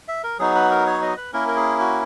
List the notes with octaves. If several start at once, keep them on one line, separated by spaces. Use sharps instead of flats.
E5
A#4
F#3 B3 D#4 F#4 G#4
B4
A#4
C#5
D#5
B4
A#3 C#4 E4 A#4
A#4
G#4
F#4